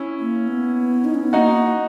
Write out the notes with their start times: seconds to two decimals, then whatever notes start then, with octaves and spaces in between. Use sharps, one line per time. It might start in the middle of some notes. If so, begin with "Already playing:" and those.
Already playing: C#4 E4
0.20 A#3
0.47 B3
1.04 D#4
1.15 C#4
1.23 B3
1.33 A#3 D#4 F#4